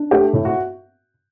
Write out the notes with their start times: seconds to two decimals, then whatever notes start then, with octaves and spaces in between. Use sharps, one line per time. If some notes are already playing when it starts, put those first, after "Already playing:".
Already playing: D4
0.11 A3 G4
0.33 A2
0.45 F#4